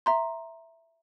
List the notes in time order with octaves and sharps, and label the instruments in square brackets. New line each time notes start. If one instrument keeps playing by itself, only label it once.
[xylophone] E5 A#5 C6